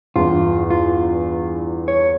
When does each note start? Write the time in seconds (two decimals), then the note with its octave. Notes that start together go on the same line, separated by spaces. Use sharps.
0.16 E2 G2 F4
0.70 F4
1.88 C#5